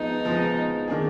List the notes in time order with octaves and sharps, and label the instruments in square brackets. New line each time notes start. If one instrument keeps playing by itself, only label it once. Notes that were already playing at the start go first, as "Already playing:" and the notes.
Already playing: [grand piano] F3 G#3 B3 [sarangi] D#4
[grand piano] F3 G#3 B3
D#3 A#3 D4 G#4